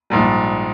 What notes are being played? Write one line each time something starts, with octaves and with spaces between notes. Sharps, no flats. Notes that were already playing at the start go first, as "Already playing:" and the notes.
A#1 G#2 G3